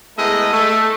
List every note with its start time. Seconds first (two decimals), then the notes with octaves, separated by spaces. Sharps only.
0.18 G#3 A3 B3 E4 A#4 D#5
0.53 A3